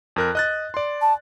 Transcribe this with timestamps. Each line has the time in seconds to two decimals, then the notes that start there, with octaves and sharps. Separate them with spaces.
0.16 F2 A#4 F#6
0.35 D#5 F#6 A6
0.74 D5 C6
1.02 A5